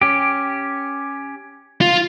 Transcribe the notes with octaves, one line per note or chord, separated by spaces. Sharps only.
C#4 G4
F4